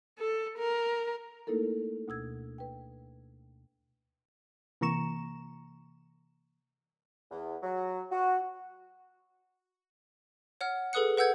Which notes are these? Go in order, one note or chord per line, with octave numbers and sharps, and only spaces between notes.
A4
A#4
A3 A#3 D#4 E4 A4 A#4
D2 B2 E6 G#6
B4 G5
C3 E3 A#3 A#5 C#6 E7
E2
F#3
F#4
C#5 F#5 F6
G#4 A4 B4 D#6 F#6 C#7
B4 F#5 E6 G6 G#6